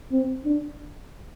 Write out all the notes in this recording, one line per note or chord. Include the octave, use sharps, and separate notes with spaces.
C4
D4